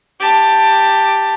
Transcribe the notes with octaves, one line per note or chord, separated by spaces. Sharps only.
G4 A5